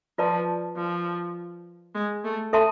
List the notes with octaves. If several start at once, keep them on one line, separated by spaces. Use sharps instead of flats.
F3 F4 B4 D5 A5
F3
G#3
A3
A4 E5 A5 C6